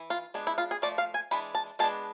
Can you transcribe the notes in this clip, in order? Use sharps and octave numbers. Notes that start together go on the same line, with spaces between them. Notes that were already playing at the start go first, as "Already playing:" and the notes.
Already playing: E3
F4
G#3 B3 D4
E4
F4
G#4
F3 A3 D5
F5
G#5
E3 G#3 D4 B5
A5
G#3 B3 D4 A5